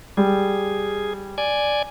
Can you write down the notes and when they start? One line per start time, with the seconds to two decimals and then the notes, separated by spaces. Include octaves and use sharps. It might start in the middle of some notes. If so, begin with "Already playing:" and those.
0.17 G3 G#4
1.38 D5 G#5